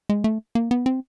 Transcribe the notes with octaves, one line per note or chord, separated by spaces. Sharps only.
G#3
A3
A#3
B3
C4